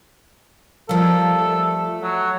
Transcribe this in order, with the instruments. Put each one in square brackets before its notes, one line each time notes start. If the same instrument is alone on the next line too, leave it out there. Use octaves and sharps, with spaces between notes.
[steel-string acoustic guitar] F3 G3 [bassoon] A#3 [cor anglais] A4
[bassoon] A3
[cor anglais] F#3